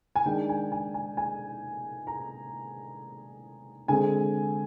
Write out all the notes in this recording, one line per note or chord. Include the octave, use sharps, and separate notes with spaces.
G#5
D#3 G#3 D4 G5
G#5
G#5
G#5
G#5
A#5
D3 G#3 C4 G#5